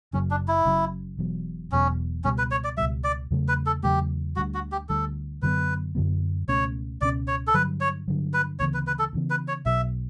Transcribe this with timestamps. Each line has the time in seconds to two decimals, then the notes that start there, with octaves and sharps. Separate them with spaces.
0.13 F#1 F#2 C#3 F#3 C#4
0.31 D4
0.48 E4
0.65 F#1 F#2 C#3 F#3
1.19 E1 E2 B2 F#3
1.72 E1 E2 B2 F#3 C#4
2.24 C#2 B2 G3 C#4
2.38 B4
2.51 C#5
2.64 D5
2.77 C#2 B2 G3 E5
3.04 D5
3.31 E2 C#3 F#3 A3
3.48 B4
3.66 A4
3.83 E2 C#3 F#3 A3 G4
4.36 D2 D3 G3 F#4
4.54 F#4
4.72 G4
4.89 D2 D3 G3 A4
5.42 F#2 D3 F#3 B3 B4
5.95 F#2 D3 F#3 B3
6.48 C#2 B2 A3 C#4 C#5
7.01 C#2 B2 A3 C#4 D5
7.28 C#5
7.47 A4
7.54 G2 D3 F#3 B4
7.81 C#5
8.08 G2 D3 F#3
8.34 B4
8.59 D2 C#3 E3 B3 C#5
8.74 B4
8.87 B4
8.99 A4
9.13 D2 C#3 E3 B3
9.30 B4
9.48 C#5
9.66 B1 B2 F#3 E5